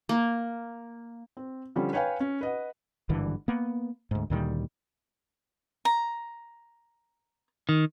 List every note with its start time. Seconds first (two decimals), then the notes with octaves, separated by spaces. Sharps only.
0.09 A#3
1.37 C4
1.76 D3 F3 G3 C#4
1.93 B4 C#5 F5 G5 G#5
2.20 C#4
2.41 B4 D#5 F#5
3.09 G#1 G2 D3 E3
3.48 A#3 B3
4.11 D2 G#2
4.30 D2 A#2 D#3 G3
5.85 A#5
7.69 D#3